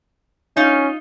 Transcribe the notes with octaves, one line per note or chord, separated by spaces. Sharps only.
C#4 D#4 F4